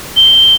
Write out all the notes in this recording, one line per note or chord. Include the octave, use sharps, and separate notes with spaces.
G7